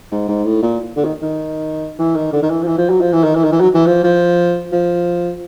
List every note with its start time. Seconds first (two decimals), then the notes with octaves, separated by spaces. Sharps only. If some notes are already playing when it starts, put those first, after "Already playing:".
0.12 G#2
0.28 G#2
0.45 A2
0.62 A#2
0.96 D3
1.05 D#3
1.22 D#3
1.99 E3
2.16 D#3
2.33 D3
2.42 D#3
2.50 E3
2.62 F3
2.67 E3
2.78 F3
2.90 F#3
3.01 F3
3.13 E3
3.24 D#3
3.35 E3
3.44 D#3
3.52 E3
3.60 F#3
3.75 E3
3.86 F3
4.04 F3
4.72 F3